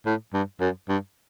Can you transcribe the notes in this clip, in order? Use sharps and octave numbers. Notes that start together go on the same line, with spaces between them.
A2
G2
F#2
G2